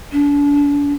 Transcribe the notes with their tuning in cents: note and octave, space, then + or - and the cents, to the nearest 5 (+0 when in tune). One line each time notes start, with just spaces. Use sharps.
D4 -40